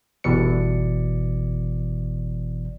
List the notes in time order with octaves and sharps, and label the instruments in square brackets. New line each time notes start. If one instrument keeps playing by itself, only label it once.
[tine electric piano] G1 B2 E3 D5 C#7